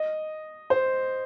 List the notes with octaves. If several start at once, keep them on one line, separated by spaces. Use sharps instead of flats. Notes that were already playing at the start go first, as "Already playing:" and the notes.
Already playing: D#5
C5